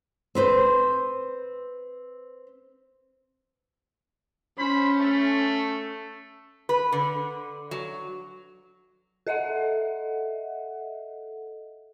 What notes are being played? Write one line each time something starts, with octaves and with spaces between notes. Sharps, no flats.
C4 B4 C5
C#4 C5 B5
A3
B4
D3
F#3
A4 D#5 E5 F#5